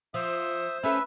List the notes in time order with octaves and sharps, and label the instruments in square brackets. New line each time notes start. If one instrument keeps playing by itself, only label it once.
[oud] F3 [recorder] C5 [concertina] E5 D#6
[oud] C#4 E4 A4 [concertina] B4 E5